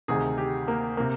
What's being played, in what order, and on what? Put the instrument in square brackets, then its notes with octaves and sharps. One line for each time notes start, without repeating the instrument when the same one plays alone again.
[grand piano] D2 C3 D#3 G#4
G4
A#3
C3 A#3